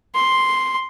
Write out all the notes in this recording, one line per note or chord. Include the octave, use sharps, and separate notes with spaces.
C6